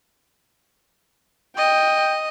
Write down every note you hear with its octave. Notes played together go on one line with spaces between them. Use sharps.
D#5 G5